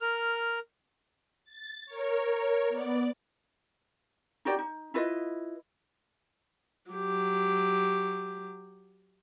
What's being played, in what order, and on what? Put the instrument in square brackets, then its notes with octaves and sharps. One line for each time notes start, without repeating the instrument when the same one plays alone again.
[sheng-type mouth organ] A#4 F6
[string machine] A6
A#4 C#5
B3 D5
[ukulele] D#4 F#4 G4 D5
D#4
E4 F4 B4 D#5
[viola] F#3 G4